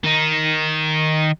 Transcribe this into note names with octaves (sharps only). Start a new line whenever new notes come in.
D#3 D#4